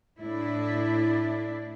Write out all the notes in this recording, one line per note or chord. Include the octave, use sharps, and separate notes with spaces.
A2 D4 E4